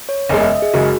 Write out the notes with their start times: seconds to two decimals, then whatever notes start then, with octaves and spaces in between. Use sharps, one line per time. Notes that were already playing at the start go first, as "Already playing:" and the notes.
0.09 C#5
0.29 F#1 E2 C#3 G#3 D#5
0.41 E5
0.51 D#5
0.62 G#4
0.73 F#1 C#3 G#3 F#4